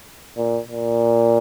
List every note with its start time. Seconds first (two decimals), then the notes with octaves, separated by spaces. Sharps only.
0.37 A#2
0.68 A#2